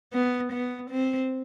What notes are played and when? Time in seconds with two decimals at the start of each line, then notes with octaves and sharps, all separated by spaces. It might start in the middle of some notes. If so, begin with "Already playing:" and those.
0.13 B3
0.53 B3
0.91 C4